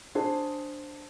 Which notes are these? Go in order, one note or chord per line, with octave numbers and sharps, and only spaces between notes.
D4 G#4 C5